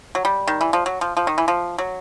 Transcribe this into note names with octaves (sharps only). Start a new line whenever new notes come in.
F#3
G3
D#3
E3
F3
F#3
F3
F3
D#3
E3
F3
F#3